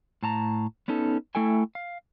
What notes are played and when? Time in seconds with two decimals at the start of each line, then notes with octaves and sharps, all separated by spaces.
0.23 A2 A5 A#5
0.88 B3 C#4 D#4 A4
1.35 A3 E4 A4 G5 G#5
1.75 F5